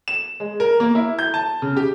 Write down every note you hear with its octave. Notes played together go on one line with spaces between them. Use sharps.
E7
G#3
A#4
A#3
E4
G6
A5
C#3
G4